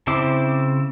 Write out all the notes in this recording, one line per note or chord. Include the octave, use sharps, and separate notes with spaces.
C#3 C4 E4 C5 D6